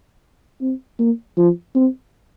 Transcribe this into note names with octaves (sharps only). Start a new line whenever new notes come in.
C4
A#3
F3
C4